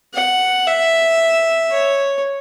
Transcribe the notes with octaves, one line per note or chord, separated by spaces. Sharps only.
F#5
E5
C#5